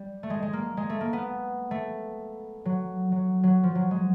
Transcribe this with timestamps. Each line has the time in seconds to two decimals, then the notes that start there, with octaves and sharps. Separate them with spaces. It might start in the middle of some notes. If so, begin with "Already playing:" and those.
Already playing: G3
0.23 A3
0.30 G#3
0.43 G#3
0.53 A#3
0.77 G#3
0.90 A3
1.01 A#3
1.13 B3
1.71 A3
2.65 F#3
3.12 F#3
3.43 F#3
3.63 F3
3.75 F#3
3.91 G#3